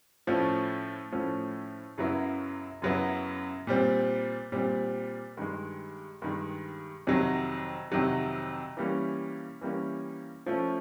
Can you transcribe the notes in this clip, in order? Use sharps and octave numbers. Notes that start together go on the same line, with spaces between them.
A2 F3 A3 C#4
A2 F3 A3 C#4
F#2 C#3 F#3 B3 E4
F#2 C#3 F#3 B3 E4
A#2 G3 C4
A#2 G3 C4
G2 D#3 G#3
G2 D#3 G#3
F2 C3 D#3 F#3
F2 C3 D#3 F#3
E3 G3 A#3 C#4
E3 G3 A#3 C#4
F3 A3 C#4